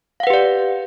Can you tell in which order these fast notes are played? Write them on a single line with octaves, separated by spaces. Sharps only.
F5 F#5 B4 G4 D5